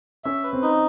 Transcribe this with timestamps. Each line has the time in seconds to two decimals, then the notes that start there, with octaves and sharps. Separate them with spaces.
0.24 C#4 E5
0.44 B4
0.53 C4
0.62 D#4